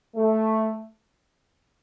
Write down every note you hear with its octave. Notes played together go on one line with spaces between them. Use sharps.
A3